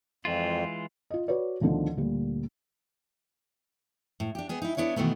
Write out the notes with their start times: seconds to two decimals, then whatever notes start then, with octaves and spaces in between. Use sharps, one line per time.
0.25 F2 E3 G#3 F4
1.10 F4 D#5
1.28 F#4 B4 C#5 D5
1.61 D2 B2 D3 D#3 F3 A3
1.97 D2 A#2 G3
4.20 A2
4.35 D4 G4
4.49 B3 G#4
4.62 D#4 E4
4.77 B3 D4 E4 C#5
4.96 B2 D#3 E3 A3 B3